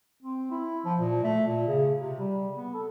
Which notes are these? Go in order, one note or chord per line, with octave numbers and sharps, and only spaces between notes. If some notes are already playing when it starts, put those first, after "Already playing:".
C4
E4
F3
A#2
A3
A#2
C#3
C3
G3
B3
A4